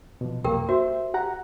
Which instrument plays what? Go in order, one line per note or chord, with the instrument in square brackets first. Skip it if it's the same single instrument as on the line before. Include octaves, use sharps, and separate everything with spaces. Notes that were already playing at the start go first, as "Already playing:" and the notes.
[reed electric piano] B2 F3
[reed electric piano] C2 F#2 A#3 [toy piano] G4 A#4 G5
[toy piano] F#4 [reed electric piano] C5 E5
[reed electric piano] G4 F#5 A#5